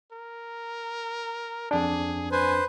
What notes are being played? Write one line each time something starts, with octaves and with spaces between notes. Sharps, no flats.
A#4
F2 D4 G#4
B4 C5 G#5